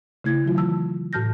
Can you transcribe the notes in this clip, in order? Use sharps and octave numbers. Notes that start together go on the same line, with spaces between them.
C#3 A3 E4 G#6
D#3 F#3 F4
E3 A5 E6
A2 F#4 A5 F6 G6 A#6